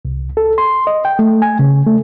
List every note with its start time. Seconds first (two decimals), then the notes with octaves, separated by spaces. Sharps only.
0.05 C2
0.37 A4
0.58 C6
0.87 D#5
1.05 G5
1.19 A3
1.42 G#5
1.59 C#3
1.87 A3